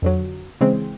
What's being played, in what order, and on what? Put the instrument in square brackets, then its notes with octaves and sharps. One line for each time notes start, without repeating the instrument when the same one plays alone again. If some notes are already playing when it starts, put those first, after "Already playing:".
[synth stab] F2 D3 F#3
C#3 E3 G#3 C4